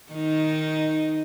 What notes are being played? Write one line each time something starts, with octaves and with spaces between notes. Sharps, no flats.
D#3 D#4